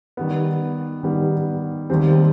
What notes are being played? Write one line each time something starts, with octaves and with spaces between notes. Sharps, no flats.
D#3 G3 B3
D#3 G3 B3
D#2 D#3 G3 C4